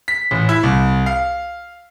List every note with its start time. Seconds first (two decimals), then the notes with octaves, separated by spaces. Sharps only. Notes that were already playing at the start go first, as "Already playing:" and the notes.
0.08 B6
0.31 A1
0.49 E4
0.63 C2
1.06 F5